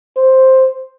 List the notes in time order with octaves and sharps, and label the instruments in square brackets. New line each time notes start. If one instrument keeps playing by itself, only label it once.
[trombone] C5